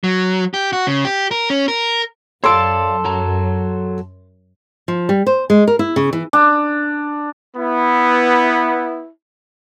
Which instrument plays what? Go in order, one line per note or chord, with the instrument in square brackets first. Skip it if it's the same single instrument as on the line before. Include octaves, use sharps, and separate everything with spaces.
[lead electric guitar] F#3
G4
F#4
C#3
G4
A#4
C#4
A#4
[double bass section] F#2 [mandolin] A4 D6 [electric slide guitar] C#5 D5 F5 [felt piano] C6 E6
[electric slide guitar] F#3 A#5
[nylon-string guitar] F3
G3
C5
G#3
A#4
E4
C#3
E3
[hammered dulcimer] D4
[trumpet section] B3 E4